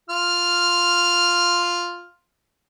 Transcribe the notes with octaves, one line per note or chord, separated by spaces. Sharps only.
F4 F6